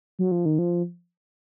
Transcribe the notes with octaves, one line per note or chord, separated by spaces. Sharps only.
F#3
F3
D#3
F3